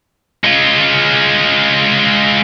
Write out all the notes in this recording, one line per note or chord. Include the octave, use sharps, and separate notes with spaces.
G#3 F4